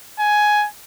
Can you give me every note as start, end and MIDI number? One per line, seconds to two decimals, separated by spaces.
0.20 0.67 80